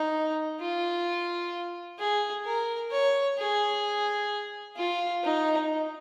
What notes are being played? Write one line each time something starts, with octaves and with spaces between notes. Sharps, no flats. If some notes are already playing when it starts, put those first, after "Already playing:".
Already playing: D#4
F4
G#4
A#4
C#5
G#4
F4
D#4